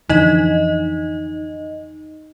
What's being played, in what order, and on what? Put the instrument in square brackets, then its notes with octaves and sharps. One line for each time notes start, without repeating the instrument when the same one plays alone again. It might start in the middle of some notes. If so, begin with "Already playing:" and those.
[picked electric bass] F2 D3 E3 [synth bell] D#4 D#5